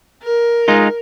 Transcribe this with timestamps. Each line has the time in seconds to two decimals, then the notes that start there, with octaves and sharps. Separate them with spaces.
0.23 A#4
0.68 G#3 D#4 F4